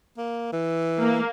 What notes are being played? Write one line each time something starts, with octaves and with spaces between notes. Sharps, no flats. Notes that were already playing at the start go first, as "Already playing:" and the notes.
A#3
E3
A#3